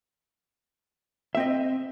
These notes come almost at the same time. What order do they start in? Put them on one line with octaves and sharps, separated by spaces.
E5 C4 D#5